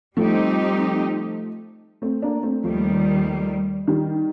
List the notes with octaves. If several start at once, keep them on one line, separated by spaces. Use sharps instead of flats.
F3 G3 A3 C4 D#4 G4
A3 C4
A#3 D4
A3 C4
D#2 D#3 F3 G3 A3
D#3 G3